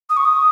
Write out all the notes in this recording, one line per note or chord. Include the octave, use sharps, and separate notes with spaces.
D#6
C#6
D#6